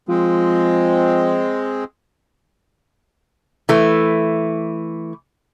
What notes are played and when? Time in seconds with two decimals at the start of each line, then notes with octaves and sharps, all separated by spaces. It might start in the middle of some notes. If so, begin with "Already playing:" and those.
0.09 F3 G#3 C4
3.69 E3 A3